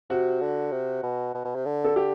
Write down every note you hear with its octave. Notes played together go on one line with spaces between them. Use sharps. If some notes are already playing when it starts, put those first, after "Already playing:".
C3 F#4
D3
C3
B2
B2
B2
C3
D3
A4
D3 G4